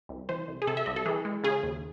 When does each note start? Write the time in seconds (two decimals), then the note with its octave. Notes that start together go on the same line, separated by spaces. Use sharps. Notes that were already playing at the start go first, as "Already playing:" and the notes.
0.09 C2
0.29 E3 C5
0.48 C2
0.62 G#4
0.67 C3 A4
0.77 E5
0.86 C2 D#5
0.96 A4
1.06 E3 G#4
1.25 G#3
1.44 C#3 G#4
1.63 D#2